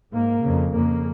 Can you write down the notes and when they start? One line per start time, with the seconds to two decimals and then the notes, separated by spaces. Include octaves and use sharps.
0.13 G#2 A#3
0.44 F2 C#3
0.74 F2 C#3 A#3